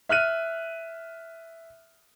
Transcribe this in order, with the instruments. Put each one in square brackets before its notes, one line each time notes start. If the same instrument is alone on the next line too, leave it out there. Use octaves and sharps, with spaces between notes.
[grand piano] E5 F6 F#6 D#7